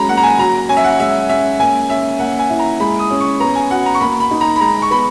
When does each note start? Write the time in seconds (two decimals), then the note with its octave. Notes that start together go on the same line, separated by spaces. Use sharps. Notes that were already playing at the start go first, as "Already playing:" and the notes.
Already playing: F#3 G#3 C#4 A#5 B5
0.09 A#3 F#5
0.17 A#5
0.23 G#5
0.38 F#3 A#5
0.69 C#4 G#5
0.77 E5
0.84 F#5
0.99 G#3 E5
1.29 C#4 E5
1.59 A#3 G#5
1.89 C#4 E5
2.19 A#3 F#5
2.39 G#5
2.50 E4
2.59 A#5
2.80 G#3 B5
2.99 D#6
3.10 C#4
3.20 C#6
3.40 B3 A#5
3.55 G#5
3.70 F#4 F#5
3.86 A#5
3.94 C#6
4.00 A#3 B5
4.20 B5
4.31 D#4
4.41 A#5
4.56 B5
4.61 G#3 A#5
4.82 C#6
4.91 B3 B5